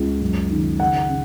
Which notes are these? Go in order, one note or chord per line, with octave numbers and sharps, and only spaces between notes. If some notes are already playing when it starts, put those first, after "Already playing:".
Already playing: C#2 C#3
F#2
D#3
C#3 F#5
C#3